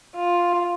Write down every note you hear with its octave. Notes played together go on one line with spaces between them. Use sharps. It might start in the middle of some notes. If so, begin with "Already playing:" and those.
F4